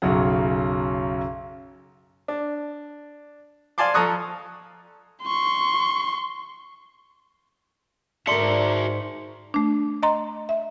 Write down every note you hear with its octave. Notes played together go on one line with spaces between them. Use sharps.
B1 F#2 C#3 F#3 F#5
D4
D5 F5 G#5 A5 C6 D6
F3 A4 A#5 C#6 D#6 F#6
C6 C#6
G#2 F#4 A#4 D5 E5 A5 C6 C#7
A3 D4
D#5 A#5 C6
E5